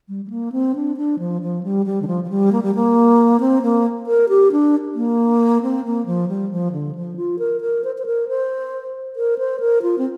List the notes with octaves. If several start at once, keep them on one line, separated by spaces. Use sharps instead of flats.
G3
G3
A#3
C4
D4
D4
F3
F3
G3
G3
D3
F3
F3
G3
A#3
G3
A#3
C4
A#3
A#4
G4
D4
A#3
C4
A#3
F3
G3
F3
D3
F3
F4
A#4
A#4
C5
C5
A#4
C5
A#4
C5
A#4
F4
C4